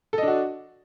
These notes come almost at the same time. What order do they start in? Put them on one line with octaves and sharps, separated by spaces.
A4 D#5 D4 F#4